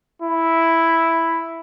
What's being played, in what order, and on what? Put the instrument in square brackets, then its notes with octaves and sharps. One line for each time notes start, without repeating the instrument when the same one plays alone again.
[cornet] E4